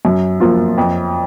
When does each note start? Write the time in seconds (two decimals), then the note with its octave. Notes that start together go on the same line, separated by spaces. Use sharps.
0.05 F#2
0.40 F3 A#3 F4
0.78 F2